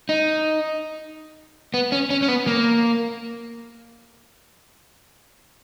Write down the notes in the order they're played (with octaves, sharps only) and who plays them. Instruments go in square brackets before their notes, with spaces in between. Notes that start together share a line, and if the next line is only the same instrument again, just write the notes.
[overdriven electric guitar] D#4
B3
C#4
C#4
C#4
B3
A#3